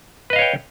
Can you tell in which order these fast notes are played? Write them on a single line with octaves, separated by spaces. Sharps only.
B4 D#5 F5 C#5 G5